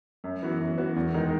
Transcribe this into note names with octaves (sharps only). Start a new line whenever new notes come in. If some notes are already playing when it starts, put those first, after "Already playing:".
F#2
E3 B3 F#4
F#2
E3 B3 F#4
E2
D#3 G#3 D#4